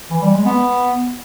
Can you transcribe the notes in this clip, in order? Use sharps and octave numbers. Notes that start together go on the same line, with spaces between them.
E3
G3
G#3
B3